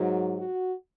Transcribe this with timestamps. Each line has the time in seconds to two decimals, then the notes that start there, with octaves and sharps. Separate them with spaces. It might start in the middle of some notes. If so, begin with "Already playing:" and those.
Already playing: G#2 F#3
0.38 F#4